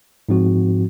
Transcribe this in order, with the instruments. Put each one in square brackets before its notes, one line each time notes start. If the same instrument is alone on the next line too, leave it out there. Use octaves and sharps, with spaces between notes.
[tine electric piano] G#2 F3 C4 F#4